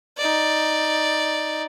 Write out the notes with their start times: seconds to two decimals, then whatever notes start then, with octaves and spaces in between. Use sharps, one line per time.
0.18 D#4 D5